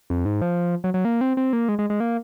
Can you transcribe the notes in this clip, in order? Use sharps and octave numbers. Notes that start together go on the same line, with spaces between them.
F2
G#2
F3
F#3
F#3
A#3
C4
C4
A#3
G#3
G#3
G#3
A#3